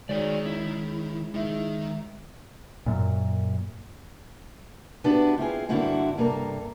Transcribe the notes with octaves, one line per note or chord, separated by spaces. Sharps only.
D#3 G#3 F#4 C#5 D5
C#4 E4
D#3 G#3 D#4 E5
F#2 A#2
B3 D4 E4 F#4 G4 B4
C4 E4 F4 G#4
G2 D3 A#3 C4 E4 F#4
G2 C3 A#3 A4 A#5